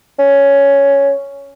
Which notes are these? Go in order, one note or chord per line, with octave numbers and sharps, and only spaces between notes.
C#4